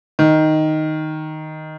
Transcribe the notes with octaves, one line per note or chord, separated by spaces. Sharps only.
D#3